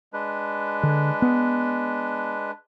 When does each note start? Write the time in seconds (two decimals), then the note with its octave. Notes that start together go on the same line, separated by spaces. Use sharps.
0.13 G#3 D4 B4
0.83 D3
1.22 B3